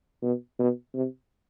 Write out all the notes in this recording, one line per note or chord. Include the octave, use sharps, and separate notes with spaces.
B2
B2
C3